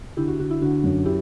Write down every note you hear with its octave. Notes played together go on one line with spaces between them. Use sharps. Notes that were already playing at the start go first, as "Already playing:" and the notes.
D3 E4 G4
F#4
D3 F#4
E4
D3 F#4
F#2
E4 G4